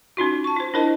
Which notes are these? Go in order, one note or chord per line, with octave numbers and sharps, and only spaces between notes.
C#4 D#4 F4 F#4
A5 C#6
F4 C5
D4 E4 A#4 C5 D#5 A5